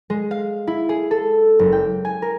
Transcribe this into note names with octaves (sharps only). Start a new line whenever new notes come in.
G#3
F5
E4
G#4
A4
F#1
G5
G#5
A#4